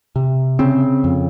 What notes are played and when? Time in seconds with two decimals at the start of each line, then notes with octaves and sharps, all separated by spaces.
0.16 C3
0.59 C#3 C4
1.04 F2